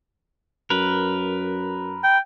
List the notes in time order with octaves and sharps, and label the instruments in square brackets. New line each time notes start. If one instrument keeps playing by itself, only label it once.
[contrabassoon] F#2 [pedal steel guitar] A#4 B4
[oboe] G5